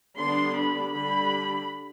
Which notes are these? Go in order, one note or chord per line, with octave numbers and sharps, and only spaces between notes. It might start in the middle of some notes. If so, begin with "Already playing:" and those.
D3 G3 B3 D4 C6
B5
D3 G3 D4 B5